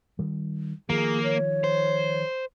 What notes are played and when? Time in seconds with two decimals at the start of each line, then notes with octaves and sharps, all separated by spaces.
0.19 D#3 G3
0.90 D#3 F3 A#3 G#4
1.23 C#5
1.64 C5